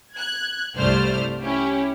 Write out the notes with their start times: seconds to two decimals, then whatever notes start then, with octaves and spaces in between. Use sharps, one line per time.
0.15 F#6 G#6
0.77 C2 G2 A3 C5 D5 F6
1.41 C#4 E4 G4